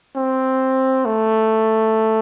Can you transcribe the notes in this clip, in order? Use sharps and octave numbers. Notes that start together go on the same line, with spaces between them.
C4
A3